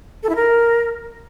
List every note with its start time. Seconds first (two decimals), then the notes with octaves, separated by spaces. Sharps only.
0.23 A4
0.29 E4
0.36 A#4